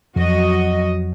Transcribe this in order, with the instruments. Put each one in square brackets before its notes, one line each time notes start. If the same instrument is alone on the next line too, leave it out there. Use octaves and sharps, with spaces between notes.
[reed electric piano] F2 [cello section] F#3 F#4 D#5